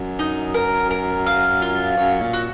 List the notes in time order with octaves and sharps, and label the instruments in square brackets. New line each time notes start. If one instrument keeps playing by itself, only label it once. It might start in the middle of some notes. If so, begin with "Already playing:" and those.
Already playing: [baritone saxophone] F#2
[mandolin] D#4
A#4
A#4
F5
F4
[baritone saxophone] F#2 [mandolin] C#5
[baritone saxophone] A#2
[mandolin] F#4